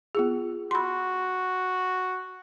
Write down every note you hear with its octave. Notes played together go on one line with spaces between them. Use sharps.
B3 F4 G#4
F#4 B5 C6